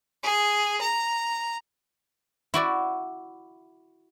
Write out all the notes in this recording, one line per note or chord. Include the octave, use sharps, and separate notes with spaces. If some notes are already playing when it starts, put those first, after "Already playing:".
G#4
A#5
E4 F#4 D5